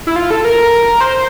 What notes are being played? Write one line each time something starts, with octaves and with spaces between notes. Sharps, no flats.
E4
F4
A4
A#4
C5